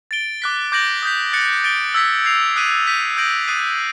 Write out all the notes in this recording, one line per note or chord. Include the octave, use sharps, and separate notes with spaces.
A6 D7 G7
D6 F#6 B6
D6 G6 A#6 D7 F#7
D#6 G6 B6
F#6 A6 C#7
A6 D7 G7
E6 G#6 B6
G#6 C7 F7
D#6 F#6 B6 D#7
G6 B6 D#7
D#6 G6 A#6 D7 F#7
D#6 F#6 A6 C7 D#7